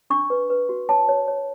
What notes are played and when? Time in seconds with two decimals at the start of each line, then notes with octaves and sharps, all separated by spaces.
0.10 D4 C#6
0.30 B4
0.50 B4
0.69 F#4
0.89 C#5 A5
1.09 C#5
1.28 C#5